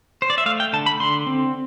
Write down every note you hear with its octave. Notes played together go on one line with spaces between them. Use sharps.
C5
D5
E5
A3 F5
G5
D3 A5
B5
D3 C6
C4